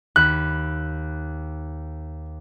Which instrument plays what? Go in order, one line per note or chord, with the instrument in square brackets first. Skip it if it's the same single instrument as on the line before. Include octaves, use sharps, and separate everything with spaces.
[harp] D#2 B5 [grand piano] F#6